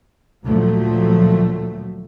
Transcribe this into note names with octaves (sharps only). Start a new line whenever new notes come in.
D2 A#2 F3 F#3 A3